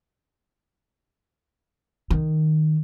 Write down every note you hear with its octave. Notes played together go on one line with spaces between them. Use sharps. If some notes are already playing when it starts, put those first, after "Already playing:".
D#3